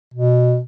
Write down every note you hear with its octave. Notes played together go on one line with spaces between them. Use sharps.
B2